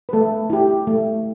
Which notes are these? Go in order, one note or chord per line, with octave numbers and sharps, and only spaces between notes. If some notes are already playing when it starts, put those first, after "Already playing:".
B4
A3 A4
E4 G4
A3